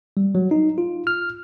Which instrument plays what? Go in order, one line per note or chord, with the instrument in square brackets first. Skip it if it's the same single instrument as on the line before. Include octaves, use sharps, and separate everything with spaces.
[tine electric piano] G3
F#3
D#4
F4
F6